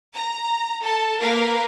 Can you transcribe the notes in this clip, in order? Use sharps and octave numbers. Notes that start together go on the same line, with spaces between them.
A#5
A4 A5
A#3 A#4 B4 F5